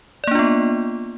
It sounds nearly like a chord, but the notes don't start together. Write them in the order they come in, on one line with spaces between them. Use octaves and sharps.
D5 A#3 D4 F4 B3